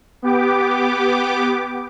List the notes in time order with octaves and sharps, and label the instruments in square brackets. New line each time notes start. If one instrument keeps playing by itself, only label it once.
[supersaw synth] B3 G4 D6